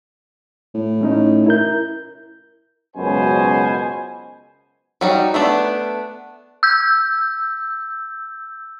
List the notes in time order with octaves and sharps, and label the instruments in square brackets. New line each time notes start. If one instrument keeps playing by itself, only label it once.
[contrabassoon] A2
[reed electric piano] A3 C#4 D#4
E4 A#4 G6
[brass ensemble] C#2 F#2 B2 C5 G#5
[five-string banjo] F#3 G3 D#4
A3 B3 D4
[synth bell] E6 G6